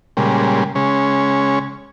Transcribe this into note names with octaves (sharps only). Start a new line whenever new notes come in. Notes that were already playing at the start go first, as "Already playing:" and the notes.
A#2 C#3 G3 G#3
C#3 G#3 C#4